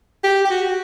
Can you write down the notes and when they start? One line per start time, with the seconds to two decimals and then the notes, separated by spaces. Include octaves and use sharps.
0.24 G4
0.45 G4
0.50 F#4